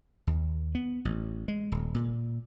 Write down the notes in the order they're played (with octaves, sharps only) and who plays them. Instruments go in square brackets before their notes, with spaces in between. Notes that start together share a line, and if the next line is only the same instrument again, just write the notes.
[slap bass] D#2
B3
A1
G#3
D#1
A#2